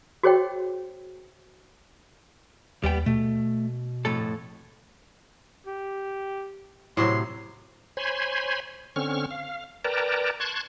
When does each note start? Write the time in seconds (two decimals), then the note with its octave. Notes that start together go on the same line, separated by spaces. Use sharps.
0.23 F#4 G#4 C5 C#5 D#5 G5
2.84 D#2 G3 B3 G5
3.06 B2 A3
4.05 F2 A2 A4
5.66 G4
6.97 A2 C3 F#3 C6
7.97 C5 C#5 G#5 B5 C6
8.96 D3 C4 C#4 C#6 F6
9.31 F5
9.85 A#4 B4 D5 G5 A5 A#5
10.40 A5 C6 C#6 F#6 G#6